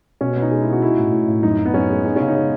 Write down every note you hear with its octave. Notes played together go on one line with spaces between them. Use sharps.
B2 C#4
B3
D#4
G#3
E4
B3
F#4
G#3 E4
A2
A2
A2
F#2 D#4
F#2
B3
F#2 C#4
G#3
G#3 D#4
C#3 C#4
D#4
G#3